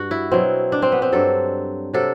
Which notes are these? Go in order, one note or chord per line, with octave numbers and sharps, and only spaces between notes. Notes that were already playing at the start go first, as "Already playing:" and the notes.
Already playing: G2 F#4
E4
B2 F#3 C4
D4
C4
B3
C4
G2 F#3 A4
C3 F#3 A4